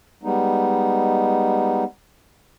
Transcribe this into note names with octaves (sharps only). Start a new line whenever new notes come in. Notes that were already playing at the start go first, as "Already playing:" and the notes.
G3 G#3 B3 D#4